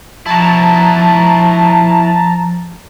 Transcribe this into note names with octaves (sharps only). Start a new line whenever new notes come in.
F3 E4 F#4 A5 A#5